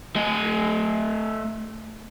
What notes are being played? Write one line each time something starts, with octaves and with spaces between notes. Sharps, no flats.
A3 D#5